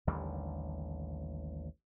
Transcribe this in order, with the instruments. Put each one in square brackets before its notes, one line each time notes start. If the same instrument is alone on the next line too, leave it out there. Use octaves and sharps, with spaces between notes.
[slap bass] A1 D#2 D3 G3